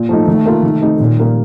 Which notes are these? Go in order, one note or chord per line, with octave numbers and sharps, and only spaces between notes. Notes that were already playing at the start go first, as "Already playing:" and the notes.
Already playing: A#2
F3 A3 D#4
D#3 A3
A#3 F4
D#3
A3 C4 D#4
A#2 D#3
G3 A#3